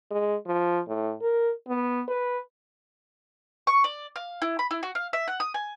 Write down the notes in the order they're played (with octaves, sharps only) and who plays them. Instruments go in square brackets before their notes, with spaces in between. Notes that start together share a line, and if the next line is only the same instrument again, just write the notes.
[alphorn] G#3
F3
A2
A#4
B3
B4
[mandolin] C#6
D5
F5
E4
B5
E4
F#4
F5
E5
F#5
D#6
G#5